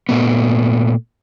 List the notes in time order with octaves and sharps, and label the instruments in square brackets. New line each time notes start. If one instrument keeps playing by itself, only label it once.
[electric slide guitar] A#2 A3 B3